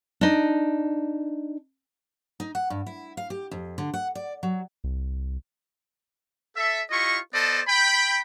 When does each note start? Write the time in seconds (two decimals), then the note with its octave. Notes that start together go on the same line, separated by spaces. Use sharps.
0.21 D4 D#4
2.40 D#4
2.55 F#5
2.70 G2
2.86 E4
3.17 F5
3.30 G4
3.51 F2
3.78 D3
3.94 F#5
4.15 D5
4.43 F#3
4.84 C2
6.56 A4 E5
6.91 E4 F4 G4 D#5 C#6
7.34 B3 A4 C5 D5 D#5 A5
7.68 G5 B5